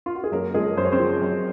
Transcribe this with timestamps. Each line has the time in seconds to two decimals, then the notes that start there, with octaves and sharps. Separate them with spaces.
0.06 F4
0.15 F#4
0.24 G#4
0.32 F#2 A#3 A#4
0.54 F3 G#3 G#4
0.77 F#2 C5
0.85 C#5
0.92 C4 C5
1.00 F3
1.22 F#2